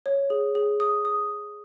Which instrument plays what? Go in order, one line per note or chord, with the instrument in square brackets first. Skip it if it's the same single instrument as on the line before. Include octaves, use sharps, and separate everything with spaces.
[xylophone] C#5
G#4
G#4
D#6
D#6